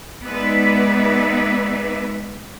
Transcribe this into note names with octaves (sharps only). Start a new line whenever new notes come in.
G#3 B3 D#4 B4 D5 E5